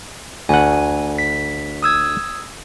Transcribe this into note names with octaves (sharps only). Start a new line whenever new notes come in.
D2 F#5 G#5
B6
D#6 E6 G#6